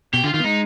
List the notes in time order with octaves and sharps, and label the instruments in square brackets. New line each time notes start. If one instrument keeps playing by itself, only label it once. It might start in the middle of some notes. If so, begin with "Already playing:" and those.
[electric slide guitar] B2 [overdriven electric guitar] G4
[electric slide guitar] D3 [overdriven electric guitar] F4
[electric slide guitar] D#3 [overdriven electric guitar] F4
[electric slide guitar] B3
[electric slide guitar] G#3 [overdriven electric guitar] D#4